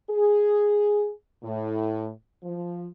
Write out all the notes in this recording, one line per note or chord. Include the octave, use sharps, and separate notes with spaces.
G#4
A2
F3